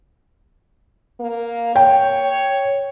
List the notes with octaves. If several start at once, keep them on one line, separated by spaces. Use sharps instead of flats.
A#3
C#5 G5